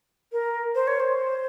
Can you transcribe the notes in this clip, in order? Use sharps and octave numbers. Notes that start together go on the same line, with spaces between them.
A#4
C5
C#5
C5